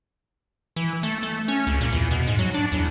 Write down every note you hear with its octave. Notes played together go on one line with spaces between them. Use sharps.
E3
A3
A3
C#4
C#2
A#2
E2
B2
G#2
F#3
D4
E2